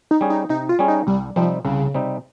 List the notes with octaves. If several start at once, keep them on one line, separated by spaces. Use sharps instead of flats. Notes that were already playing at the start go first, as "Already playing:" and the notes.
D#4
G3 C#4 G#4
D#4
C3 D#4
F4
G3 C#4 G#4
D#4
C2 G3
C3 F3 G3 C4 D#4
C2 C#3
C3 G3 C4 D#4